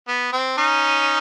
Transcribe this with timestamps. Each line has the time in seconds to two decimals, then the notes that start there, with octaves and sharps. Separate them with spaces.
0.08 B3
0.33 C4
0.58 C#4 D#4